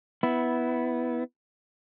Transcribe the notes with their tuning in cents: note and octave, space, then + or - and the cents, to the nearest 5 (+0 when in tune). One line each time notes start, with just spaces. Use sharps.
B3 +0 E4 -10